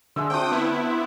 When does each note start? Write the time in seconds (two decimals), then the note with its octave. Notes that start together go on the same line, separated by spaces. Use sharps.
0.16 D3 G#3 E5 E6
0.30 C4 D4 F4 G5 D#6
0.52 B3 E4